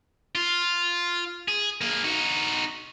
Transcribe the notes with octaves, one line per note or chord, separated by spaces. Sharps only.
F4
G#4
A#3 G#4
D#4 F#4